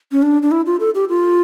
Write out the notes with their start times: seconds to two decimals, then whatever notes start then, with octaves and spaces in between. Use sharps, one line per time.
0.12 C#4
0.22 D4
0.42 D4
0.51 E4
0.66 F4
0.80 A4
0.95 G4
1.09 F4